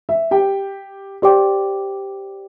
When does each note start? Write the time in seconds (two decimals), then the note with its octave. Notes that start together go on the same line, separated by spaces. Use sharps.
0.09 E5
0.31 G4 G5
1.22 G4 C5 D5 G5 D6